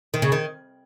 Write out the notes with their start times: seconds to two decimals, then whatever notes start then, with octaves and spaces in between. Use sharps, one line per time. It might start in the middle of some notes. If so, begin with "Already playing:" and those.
0.14 D#3
0.22 C#3
0.32 D#3